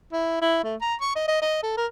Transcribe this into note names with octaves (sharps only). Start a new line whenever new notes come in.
E4
E4
A3
A#5
C#6
D#5
D#5
D#5
A4
A#4